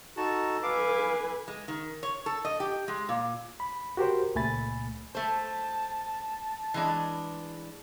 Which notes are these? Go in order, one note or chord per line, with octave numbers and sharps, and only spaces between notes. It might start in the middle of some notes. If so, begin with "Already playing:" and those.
D#4 F#4 A4 A5
B4 F5 G#5 D6
G#3
D#3
C#5
A4
D#5
G4
G#3
A#2
B5
F#4 G4 A#4 C5
C#2 A#2 A3 G#5 B5 A6
A3 C5 A5
E3 G#3 D4